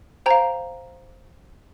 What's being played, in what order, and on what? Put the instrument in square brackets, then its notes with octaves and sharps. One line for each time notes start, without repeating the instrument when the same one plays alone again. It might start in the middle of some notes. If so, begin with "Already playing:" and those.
[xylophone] C5 F5 G5 A#5